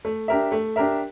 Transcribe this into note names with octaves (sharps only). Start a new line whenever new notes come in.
A3
D4 G4 A#4 E5
A3
D4 G4 A#4 E5